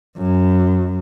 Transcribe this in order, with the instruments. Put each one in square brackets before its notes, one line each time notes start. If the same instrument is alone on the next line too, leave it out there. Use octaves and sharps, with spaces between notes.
[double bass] F#2